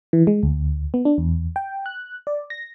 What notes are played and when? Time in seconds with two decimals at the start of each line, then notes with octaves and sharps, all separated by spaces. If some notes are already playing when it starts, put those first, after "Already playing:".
0.13 E3
0.27 G#3
0.43 D2
0.94 B3
1.05 D4
1.18 E2
1.56 G5
1.86 F#6
2.27 D5
2.50 A#6